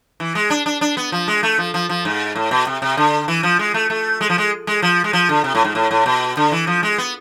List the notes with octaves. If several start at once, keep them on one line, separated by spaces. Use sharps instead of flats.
E3
G#3
D4
D4
D4
B3
F3
G#3
A3
F3
F3
F3
G#2
A2
B2
C3
C3
D3
E3
F3
G#3
A3
A3
G#3
F3
G#3
G#3
F3
G#3
F3
D3
C3
A2
G#2
A2
A2
B2
D3
E3
F3
G#3
B3